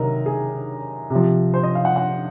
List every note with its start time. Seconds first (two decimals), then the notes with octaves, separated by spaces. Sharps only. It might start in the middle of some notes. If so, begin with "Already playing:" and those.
Already playing: C3 D#3 F#3 A#4 D#5
0.26 G#4
1.10 C3
1.15 F3
1.54 C5
1.63 D#5
1.75 F5
1.85 F#5
1.96 F#5